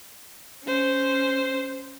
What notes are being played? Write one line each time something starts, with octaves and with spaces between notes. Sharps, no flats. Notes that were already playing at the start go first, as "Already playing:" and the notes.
C#4 C5